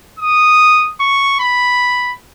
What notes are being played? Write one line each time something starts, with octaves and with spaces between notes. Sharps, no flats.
D#6
C#6
B5